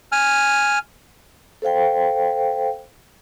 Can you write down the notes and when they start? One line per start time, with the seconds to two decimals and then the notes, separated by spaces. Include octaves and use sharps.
0.12 G#5 F6
1.62 A4 C5 F5 G5